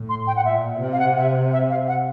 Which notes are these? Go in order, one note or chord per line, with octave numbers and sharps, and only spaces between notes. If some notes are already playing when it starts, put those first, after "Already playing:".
Already playing: A2
C6
G5
F#5
A#2 E5
C3
F5
F#5
E5
E5
F5
F#5